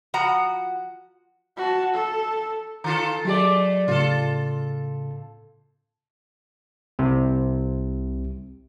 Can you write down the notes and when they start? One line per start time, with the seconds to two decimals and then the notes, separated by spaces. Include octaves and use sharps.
0.14 F3 F#4 F#5 A#5
1.57 F#4 A5
1.95 A4
2.84 D#3 F4 A4 A#5
3.25 F#3 G#3 A3 G4 D5
3.88 A2 C#3 F4 A4
6.99 C2 C3